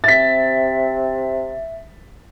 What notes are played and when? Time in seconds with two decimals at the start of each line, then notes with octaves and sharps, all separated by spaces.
0.04 C3 C4 E5 A6 B6